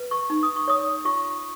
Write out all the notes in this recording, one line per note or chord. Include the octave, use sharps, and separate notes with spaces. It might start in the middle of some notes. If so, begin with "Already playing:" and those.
Already playing: B4
C#6
D#4
D#6
C#6
C#5 D#6
F4 C#6